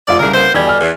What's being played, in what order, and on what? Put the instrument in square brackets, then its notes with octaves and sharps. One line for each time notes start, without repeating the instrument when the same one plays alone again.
[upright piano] F1 F4 [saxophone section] D5
[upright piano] C2 C#3 [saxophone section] D4 G#4 A#4
[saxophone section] A#3 B3 C5
[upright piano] E2 G#6 [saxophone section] B2 D3 G3
[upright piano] G#5 F6
[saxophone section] E2